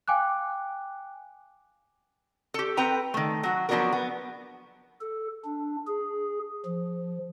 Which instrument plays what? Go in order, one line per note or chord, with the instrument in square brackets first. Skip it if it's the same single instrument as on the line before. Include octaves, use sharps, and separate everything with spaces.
[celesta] F5 G5 G#5 D6 F#6
[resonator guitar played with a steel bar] G4 A4
C4 A4 B4 G5 A#5
D#3 A3
F#3 F#4
F3 F#3 B3 D4 F#4 A#4
B3
[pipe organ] A4
D4
G#4
F3